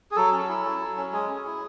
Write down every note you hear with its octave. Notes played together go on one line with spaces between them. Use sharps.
G#4
F#3 A4
C#4
E4
F#3
F#3
C#4
G#3 G#4
C#4
E4